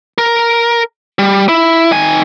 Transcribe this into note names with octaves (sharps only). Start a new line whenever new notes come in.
A#4
G3
E4
D#3 G#5